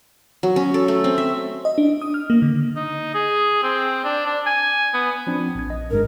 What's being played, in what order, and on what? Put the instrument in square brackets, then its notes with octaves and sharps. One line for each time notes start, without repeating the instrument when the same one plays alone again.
[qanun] F#3
C#4
A4
A3
C4
E5
[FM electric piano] D#5
D4
D#6
F6
A#3
D3
[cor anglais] D#4
G#4
C4
D4
D4
G#5
B3
[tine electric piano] F3 C4 D4
A#1 G#6
D#5
[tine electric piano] G1 G2 G#3 [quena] A#4